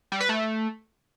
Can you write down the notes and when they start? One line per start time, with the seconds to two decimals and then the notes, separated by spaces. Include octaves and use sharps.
0.12 G3
0.20 B4
0.29 A3